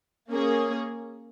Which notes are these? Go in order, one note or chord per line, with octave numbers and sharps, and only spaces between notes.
A#3 C#4 G#4